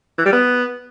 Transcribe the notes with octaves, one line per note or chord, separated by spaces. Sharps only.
E3
G3
B3